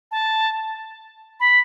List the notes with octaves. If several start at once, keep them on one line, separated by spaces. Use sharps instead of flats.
A5
B5